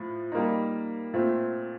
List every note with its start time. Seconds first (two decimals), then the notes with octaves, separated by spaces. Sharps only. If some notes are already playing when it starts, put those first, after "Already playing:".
Already playing: A2 F3
0.32 G3 A#3 D#4
1.13 A#2 A3 C4